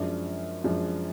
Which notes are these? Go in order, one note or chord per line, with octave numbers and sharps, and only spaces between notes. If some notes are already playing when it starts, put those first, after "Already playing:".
Already playing: F#2 F3 G#3 D4
F#2 F3 G#3 D4